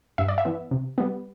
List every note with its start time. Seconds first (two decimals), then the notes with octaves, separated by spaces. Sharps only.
0.18 G2 E5
0.28 D5
0.38 E5
0.45 E3 B3
0.71 C3
0.98 G3 B3